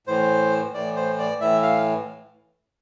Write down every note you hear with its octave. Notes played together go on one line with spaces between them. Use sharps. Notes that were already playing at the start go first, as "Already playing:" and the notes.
A2 E3 C5
A2 E3 D5
C5
D5
A2 E3 E5
F5